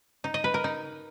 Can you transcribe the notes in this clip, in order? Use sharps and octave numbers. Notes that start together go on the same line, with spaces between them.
D#4
D#5
B4
A#4
D#4